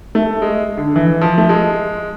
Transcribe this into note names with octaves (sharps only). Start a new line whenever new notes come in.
A3
G#3
D3
E3
F3
A3
G#3